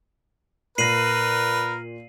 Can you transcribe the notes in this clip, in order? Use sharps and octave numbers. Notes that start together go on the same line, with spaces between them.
A#2 A#4 B4 A#6 C7 D#7 F#7